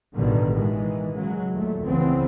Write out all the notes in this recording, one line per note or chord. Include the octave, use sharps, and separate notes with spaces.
A1 G2 B2 D3 D#3 G3
D#3 E3 G#3
C#3 F#3 G#3
D#2 A#2 A3
C2 C#3 E3 B3 C4